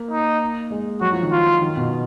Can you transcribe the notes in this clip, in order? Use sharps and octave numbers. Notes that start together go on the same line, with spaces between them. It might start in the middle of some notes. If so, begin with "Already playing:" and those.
Already playing: A#3
D#4
G#3
F#3 F#4
F3
D#3
F3 F4
D#3
B2